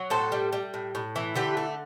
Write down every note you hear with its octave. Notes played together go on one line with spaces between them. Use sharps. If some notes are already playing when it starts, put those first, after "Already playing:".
Already playing: F#3
A2 A4 C5
G3
G3
A2
A2
E3
D3 G4 B4
A3